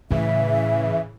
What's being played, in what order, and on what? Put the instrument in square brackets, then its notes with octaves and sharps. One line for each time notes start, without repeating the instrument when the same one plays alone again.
[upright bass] A2 [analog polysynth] C#3 E3 [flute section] E5